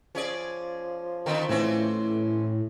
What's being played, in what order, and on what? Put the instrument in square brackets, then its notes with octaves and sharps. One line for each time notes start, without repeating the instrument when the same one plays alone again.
[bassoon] F3 [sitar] C#4 G#4 D5
[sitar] D3 D#3 C4
[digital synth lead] A2 [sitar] E3 C4 C#4